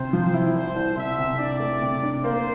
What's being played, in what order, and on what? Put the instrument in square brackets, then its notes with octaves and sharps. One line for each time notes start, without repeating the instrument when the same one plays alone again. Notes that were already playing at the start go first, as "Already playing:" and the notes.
Already playing: [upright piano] C3 [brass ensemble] C5
[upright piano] F3
E4
[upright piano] C2 [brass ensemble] C5
[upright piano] C2
[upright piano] C3 [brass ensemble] E5
[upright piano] C3
[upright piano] D4 [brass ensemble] D5
[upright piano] A3
C3
D4
[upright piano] A#3 [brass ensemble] C5